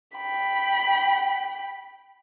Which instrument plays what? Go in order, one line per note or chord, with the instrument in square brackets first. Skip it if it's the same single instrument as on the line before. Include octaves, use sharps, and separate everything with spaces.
[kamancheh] G5 B5